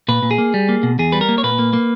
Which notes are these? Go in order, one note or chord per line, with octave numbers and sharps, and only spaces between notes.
A#2 B4
A#2
G#4
A#3
G3
A#3
B2
E2 G#4
G3 B4
A#4
A#3
C#5
A#2 B4
A#3
A#3